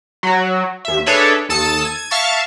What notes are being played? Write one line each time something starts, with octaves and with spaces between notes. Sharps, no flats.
F#3 F#4
D#2 E5
D4 G#4 A4 B4 C#5 E5
D#2 A4 A5 D#6 E6 E7
G#6 D#7
E5 F5 A5 C#6 A6